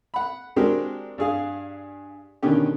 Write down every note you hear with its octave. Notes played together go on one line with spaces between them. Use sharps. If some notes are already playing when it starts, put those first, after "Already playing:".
F#5 B5
G#3 C4 D4 F#4 G4 A#4
G2 G#4 F5
B2 D3 D#3 C#4 G4